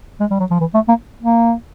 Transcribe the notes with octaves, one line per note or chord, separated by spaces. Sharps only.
G#3
G3
F#3
F3
E3
A3
A#3
A#3